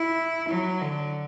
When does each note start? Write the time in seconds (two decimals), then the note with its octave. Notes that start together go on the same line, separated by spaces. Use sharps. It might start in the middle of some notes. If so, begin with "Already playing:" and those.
Already playing: E4
0.49 F#3
0.81 D3